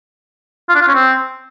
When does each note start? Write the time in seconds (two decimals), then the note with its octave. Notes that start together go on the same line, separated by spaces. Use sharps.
0.69 F4
0.75 D4
0.82 F4
0.88 C#4
0.94 C4